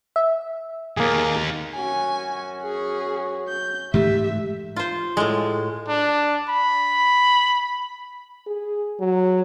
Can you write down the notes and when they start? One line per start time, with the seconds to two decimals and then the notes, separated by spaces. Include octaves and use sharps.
0.16 E5
0.97 D#2 A#3 G#4
1.74 F#2 C#4 F#4 G#5
2.63 G#4
3.49 G6
3.94 G#2 E3 A3 G4 E5
4.76 F4 C5
5.17 A2 G#3
5.88 D4
6.50 B5
8.47 G#4
9.00 F#3